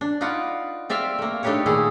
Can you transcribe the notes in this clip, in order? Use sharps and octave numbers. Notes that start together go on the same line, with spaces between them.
D4
D#4 F4 B4 D5 F#5
C4 D5 E5 F5
A3 A#3
A3 D4 D#4 G4 B4 C#5
A#2 D#3 A3 E4 G#4